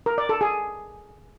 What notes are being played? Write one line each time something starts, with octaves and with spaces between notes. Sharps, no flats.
A#4
D5
A4
G#4